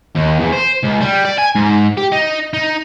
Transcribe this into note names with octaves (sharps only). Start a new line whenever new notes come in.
D#2
E2
C5
C#2
G3
D5
G#5
G#2
G4
D#4
D#4